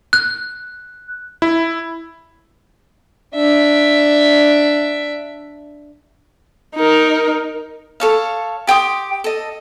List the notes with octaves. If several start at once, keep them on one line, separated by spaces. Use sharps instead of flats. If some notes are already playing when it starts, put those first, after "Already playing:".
F#6
E4
D4 E5
D#4 A#4
A4 C#5 F5
G4 G5 C6 D#6
A4 D#5